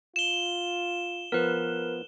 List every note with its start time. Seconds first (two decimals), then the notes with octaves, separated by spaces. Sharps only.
0.16 F4 E7 G7
1.32 F3 B3 A#4 B4